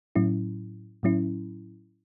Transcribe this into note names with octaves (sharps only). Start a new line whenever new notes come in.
A2 F#3 C#4 E4
A2 F#3 C#4 E4